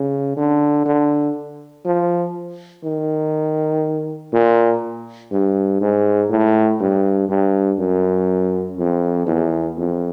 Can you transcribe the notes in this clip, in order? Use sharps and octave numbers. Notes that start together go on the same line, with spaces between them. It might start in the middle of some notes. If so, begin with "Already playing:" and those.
Already playing: C#3
D3
D3
F3
D#3
A#2
G2
G#2
A2
G2
G2
F#2
F2
E2
F2